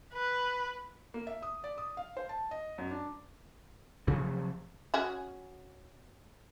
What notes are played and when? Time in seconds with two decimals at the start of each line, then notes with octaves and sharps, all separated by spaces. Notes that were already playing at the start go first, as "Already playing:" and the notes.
0.13 B4
1.14 A#3
1.27 E5
1.42 D#6
1.64 D5
1.78 D#6
1.97 F5
2.17 C5
2.29 A5
2.51 D#5
2.78 F#2
2.91 D4
4.07 C3 F3 F#3 A3
4.94 C#4 F#4 G#4